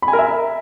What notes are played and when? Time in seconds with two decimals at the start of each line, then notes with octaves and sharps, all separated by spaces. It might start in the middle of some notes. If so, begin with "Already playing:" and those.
0.02 B5
0.08 G#5
0.13 A#4
0.19 E5